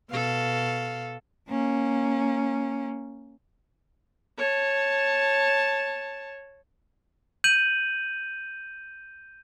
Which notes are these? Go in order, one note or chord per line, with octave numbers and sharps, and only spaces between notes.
B2 A4 F5
A#3 C#4
C#5 A5
G6 D#7 F#7